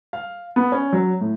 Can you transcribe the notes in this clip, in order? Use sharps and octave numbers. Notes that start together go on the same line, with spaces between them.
F5
B3
C#4
F#3
A2